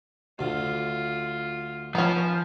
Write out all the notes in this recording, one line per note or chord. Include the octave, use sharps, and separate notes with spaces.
D2 D3 F4
F3 B3 C#4